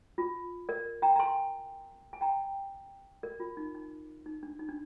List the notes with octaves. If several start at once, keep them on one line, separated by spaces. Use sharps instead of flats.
F4
A#4 D5
G5 A#5
A#5
G#5 C6
G#5
G5 A#5
A#4 D5
F4
D#4
D#4
D#4
D4
D#4
D4